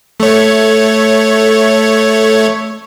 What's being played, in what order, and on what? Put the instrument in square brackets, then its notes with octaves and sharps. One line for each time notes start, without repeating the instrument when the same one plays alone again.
[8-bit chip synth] A3 C#5